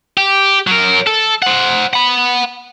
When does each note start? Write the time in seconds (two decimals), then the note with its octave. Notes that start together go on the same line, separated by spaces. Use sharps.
0.17 G4
0.67 F#3 A#4
1.07 A4
1.42 C5 F#5
1.93 F#5 B5